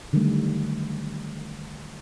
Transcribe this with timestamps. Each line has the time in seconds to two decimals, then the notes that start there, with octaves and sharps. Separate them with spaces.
0.13 D3 D#3 F#3 G3 A3